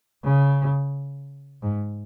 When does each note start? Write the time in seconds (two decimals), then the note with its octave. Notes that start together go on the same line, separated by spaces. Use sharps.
0.24 C#3
1.62 G#2